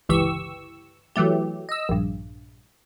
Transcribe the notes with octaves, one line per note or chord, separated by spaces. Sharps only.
G1 C#2 E3 G4 C#6 E6
E3 F#3 A3 G4
D#5 E6
A#1 G2